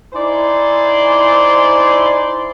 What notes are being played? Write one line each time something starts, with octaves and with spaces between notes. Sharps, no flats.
D#4 E4 C5 D5 G#5 C6